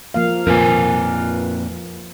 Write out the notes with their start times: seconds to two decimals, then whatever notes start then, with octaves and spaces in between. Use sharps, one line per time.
0.14 F3 A#3 F5
0.47 F2 A#2 A#4 B4 G#5